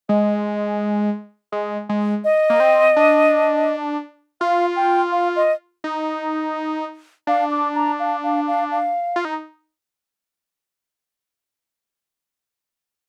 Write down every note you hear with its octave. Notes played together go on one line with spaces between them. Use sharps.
G#3 D#5
G#3
G#3
D#5
A#3
C4
D4
F4 F5
G5
F5
D#5
D#4
D4 F5
D6
A#5
F5
F5
F5
F5
F4
D#4